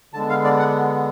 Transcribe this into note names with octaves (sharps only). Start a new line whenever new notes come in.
D3 G#3 B3 A5
F5
D5
F#5